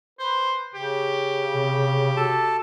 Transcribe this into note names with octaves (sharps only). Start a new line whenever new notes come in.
B4 C5
C#3 G4
C3
F#4 A4 A5